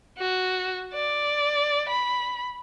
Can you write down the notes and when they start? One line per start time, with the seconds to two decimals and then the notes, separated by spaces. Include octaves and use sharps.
0.18 F#4
0.94 D5
1.89 B5